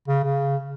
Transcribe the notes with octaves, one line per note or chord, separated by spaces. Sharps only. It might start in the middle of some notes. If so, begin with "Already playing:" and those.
C#3
C#3